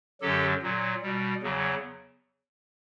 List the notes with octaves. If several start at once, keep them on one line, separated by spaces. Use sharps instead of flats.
F#2 D3 F#3 G4 A4
A#2 F#3
B2 G3
E2 C#3 F#3